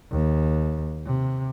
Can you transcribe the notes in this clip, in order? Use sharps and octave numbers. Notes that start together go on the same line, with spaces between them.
D#2
C3